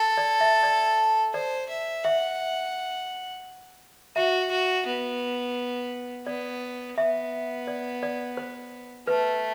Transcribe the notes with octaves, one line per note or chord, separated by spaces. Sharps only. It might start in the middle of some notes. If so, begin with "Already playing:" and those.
Already playing: A4
D5
E5
D5
C5 D5
E5
E5 F#5
F#4 E5
F#4
B3
B3 D5
B3 E5
D5
D5
C5
A3 B4